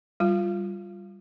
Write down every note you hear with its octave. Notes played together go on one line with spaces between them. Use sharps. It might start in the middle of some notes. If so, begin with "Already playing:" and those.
G3 F4